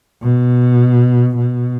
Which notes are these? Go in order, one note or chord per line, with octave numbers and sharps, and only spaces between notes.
B2
B2